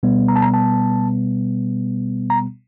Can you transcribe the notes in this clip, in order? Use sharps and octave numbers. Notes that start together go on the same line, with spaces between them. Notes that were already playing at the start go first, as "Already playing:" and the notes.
B2 G3 B3
A#5
A5
A#5
A5
A#5